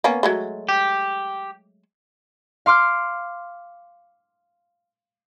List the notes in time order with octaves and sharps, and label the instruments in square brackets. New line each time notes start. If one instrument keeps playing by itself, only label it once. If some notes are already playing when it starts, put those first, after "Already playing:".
[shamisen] A#3 B3 C#4
F#3 G#3 A3
[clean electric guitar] G4
[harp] F5 C6 D6 F6